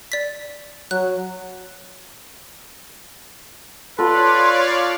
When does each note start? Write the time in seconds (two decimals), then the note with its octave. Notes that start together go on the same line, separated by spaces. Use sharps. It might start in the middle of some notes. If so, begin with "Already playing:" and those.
0.12 D5 B6
0.91 F#3 F#6
3.99 F4 A4 B4 C#5 D5 F5 C6